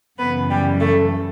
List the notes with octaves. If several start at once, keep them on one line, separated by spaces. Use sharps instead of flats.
F#2 C#3 E3 B3 B4
G3 G4
A3 A4